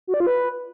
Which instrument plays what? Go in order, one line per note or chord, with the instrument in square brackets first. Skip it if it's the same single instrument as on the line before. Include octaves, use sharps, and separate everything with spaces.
[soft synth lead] F#4
D5
F4
B4